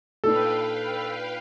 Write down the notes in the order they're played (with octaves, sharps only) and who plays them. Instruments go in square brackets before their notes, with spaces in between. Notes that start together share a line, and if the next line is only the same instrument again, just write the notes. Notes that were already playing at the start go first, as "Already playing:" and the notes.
[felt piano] A#2 D4 D#4 [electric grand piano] A4 [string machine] B4 F5 G5